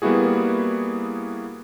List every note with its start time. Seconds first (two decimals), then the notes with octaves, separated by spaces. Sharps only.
0.02 G3 A#3 B3 E4 F#4 G#4